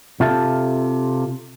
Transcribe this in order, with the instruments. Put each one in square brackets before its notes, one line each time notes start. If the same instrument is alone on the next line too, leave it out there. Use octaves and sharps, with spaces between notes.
[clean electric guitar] C3 F4 A4 E5 A5